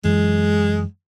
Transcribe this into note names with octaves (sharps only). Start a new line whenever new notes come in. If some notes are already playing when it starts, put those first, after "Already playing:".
F#2 E3 G#3